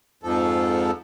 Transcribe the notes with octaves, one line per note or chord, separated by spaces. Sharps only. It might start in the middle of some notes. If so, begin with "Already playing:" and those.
F2 G#2 F3 A4